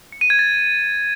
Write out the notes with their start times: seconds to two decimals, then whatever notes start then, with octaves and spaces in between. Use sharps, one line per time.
0.12 C#7
0.21 D#7
0.30 G#6
0.39 A6